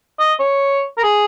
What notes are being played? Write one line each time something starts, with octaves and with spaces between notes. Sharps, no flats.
D#5
C#5
A#4
G#4